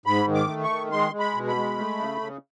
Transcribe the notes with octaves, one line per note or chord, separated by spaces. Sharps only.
G#2 B5
D#3
D6
A3
C#6
D#3
G#3 C6
G#3
B5
B2
B5
G#3
A3
C#3
C#3